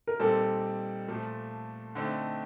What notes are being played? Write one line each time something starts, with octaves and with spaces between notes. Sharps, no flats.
A#4
A#2 G3 C4 D#4 A4
A#2 F3 A3
D3 A3 C4 D#4